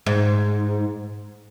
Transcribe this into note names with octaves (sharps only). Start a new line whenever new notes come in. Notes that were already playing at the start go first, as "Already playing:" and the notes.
G#2